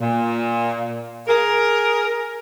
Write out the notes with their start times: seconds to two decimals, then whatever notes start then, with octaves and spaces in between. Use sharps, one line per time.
0.01 A#2
1.28 G#4 A#4